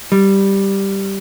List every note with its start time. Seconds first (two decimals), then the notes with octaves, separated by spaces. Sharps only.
0.12 G3